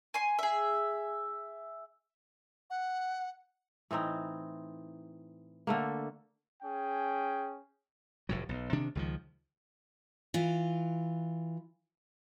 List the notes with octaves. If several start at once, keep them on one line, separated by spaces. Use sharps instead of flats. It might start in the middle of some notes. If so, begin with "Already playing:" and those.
G#5 C6
G#4 E5
F#5
A2 E3 C4 D#4
D3 A3 A#3
C#4 G#4 G5
F1 A2 F#3
B1
C3 D#3 D4
C#2 D#3 F3
E3 F4